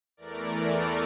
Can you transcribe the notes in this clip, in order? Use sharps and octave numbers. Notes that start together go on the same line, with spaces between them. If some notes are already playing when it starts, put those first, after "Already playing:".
E2 E3 A3 A#4 D5
A#4 D5